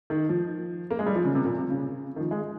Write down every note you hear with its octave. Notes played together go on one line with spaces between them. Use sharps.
D#3
F3
A#3
G#3
G3
F3
C#3
C3
A#2
C3
C#3
D#3
F3
G#3